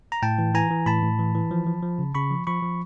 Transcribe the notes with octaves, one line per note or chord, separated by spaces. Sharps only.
A#5
A2 G5 A5
E3
E3 G#5 A#5
E3
A2 A5 B5
A2
E3
E3
F3
F3
F3
C#3
C#3 B5 C#6
F3
F3 B5 C#6
F3